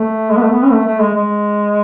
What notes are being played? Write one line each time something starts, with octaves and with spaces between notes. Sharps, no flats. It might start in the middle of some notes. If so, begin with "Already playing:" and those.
Already playing: A3
G#3
B3
A3
B3
C#4
A3
A3
G#3
G#3